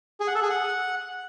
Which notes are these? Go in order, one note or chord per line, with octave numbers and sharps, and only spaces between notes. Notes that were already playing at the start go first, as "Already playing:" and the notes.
G#4
F#5
A4
G#4
F#5